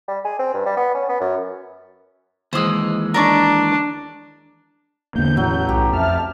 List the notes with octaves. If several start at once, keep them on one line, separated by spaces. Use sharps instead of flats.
G3
G#4
C4
G2
G3
B3
C#4
B3
F#2
D#2 E3 G#3 C5 D#6
D4 A#4 D5 C#6
E1 E2 D3 A#3 G6
A1 A2 F#3
B1 G4
F2 E5 A5 F6